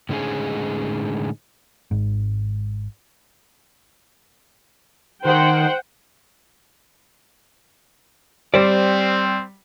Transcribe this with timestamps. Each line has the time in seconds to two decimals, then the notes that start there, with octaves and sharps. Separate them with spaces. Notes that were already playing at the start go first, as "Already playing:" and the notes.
0.09 A2 D3 G#3 C#4 D#4 G#4
1.91 G#1 G#2
5.25 D#3 C5 F#5 G5
8.54 G3 C4 C5 D5